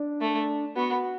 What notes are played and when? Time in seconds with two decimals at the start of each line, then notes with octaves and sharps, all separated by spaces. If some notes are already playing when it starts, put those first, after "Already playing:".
Already playing: D4
0.21 A3
0.76 B3 F#4